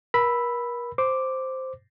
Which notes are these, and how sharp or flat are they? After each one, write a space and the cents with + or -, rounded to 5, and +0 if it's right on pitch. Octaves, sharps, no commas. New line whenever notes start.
A#4 +35 B5 +0 E6 +0
C5 +0 D6 +0